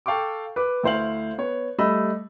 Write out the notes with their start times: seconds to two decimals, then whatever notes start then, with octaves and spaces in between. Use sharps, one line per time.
0.06 A4 F5 G5 C#6 D6
0.56 B4 D6
0.83 D2 E4 C5 F5 F#7
1.38 B3 C#5
1.78 G3 A3 D#5 B5 E6